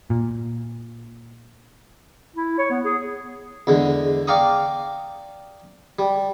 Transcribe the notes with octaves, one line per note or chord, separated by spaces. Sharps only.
A#2
E4
C#5
B3
G#4
E2 D3 G#3
D5 F5 G5 A#5 C#6 D#6
G3